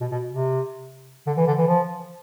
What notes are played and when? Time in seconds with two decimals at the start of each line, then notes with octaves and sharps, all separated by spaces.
0.01 B2
0.12 B2
0.32 C3
1.27 D3
1.37 E3
1.47 D3
1.58 E3
1.68 F3